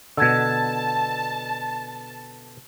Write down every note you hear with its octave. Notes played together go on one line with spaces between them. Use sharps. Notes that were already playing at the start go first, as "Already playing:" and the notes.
B2 D3 A5 E6 G#6